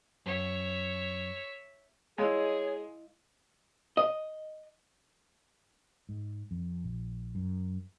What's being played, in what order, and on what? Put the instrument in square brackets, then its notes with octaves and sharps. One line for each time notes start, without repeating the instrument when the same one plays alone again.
[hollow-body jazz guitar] F#2 [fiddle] C#5 E5
[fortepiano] G#3 [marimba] E4 D#5 F5 [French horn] G#4 [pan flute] C#5
[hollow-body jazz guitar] D#5
[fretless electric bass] G#2
F2
A#1
F#2